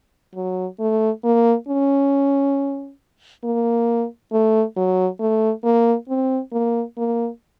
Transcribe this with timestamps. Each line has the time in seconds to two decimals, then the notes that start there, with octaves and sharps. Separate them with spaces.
0.35 F#3
0.79 A3
1.24 A#3
1.68 C#4
3.44 A#3
4.32 A3
4.76 F#3
5.20 A3
5.64 A#3
6.09 C4
6.52 A#3
6.97 A#3